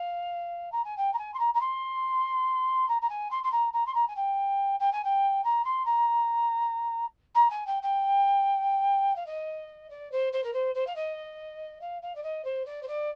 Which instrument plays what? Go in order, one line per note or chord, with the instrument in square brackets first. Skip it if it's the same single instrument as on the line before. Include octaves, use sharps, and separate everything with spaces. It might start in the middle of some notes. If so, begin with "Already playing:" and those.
Already playing: [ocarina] F5
A#5
G#5
G5
A#5
G#5
C6
A#5
A#5
C6
A#5
A#5
G#5
C6
C6
A#5
A#5
C6
A#5
G#5
G5
G5
G#5
G5
A#5
C6
A#5
A#5
G#5
G5
G5
F5
D#5
D5
C5
C5
A#4
C5
C5
F5
D#5
F5
F5
D5
D#5
C5
D5
C5
D5